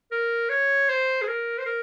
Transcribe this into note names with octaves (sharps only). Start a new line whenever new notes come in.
A#4
C#5
C5
G#4
A#4
C5
A#4